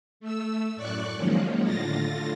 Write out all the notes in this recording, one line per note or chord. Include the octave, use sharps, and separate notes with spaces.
A3 E6
F#2 A2 D5 C#6 F#6
D#3 F3 F#3 G#3 A#3 C#4
A2 D3 F4 A6 A#6